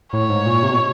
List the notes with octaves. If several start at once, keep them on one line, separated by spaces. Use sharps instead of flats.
A2 C#5
G#2
A#2
C3
B2